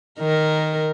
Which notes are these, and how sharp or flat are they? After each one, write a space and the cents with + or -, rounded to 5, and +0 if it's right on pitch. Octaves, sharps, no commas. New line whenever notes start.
D#3 +0 A#4 +0